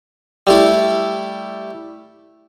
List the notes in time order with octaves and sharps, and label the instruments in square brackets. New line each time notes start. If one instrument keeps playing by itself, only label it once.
[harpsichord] G3 A3 E4